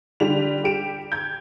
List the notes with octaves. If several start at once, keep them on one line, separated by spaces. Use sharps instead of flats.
D3 G3 F7
G4 D7 E7
G6 G#6